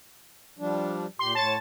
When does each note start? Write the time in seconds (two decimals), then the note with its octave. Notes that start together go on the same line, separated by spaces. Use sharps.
0.59 F3 G3 D4
1.19 A#2 G4 C6
1.35 A2 C#5 A5 A6